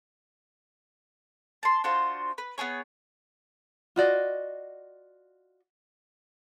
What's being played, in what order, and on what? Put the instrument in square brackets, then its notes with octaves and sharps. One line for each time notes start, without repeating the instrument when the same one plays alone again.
[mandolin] A5 C6
D4 F4 F#4 C5
B4
B3 E4 G#4 C#5
[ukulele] F4 F#4 D5 D#5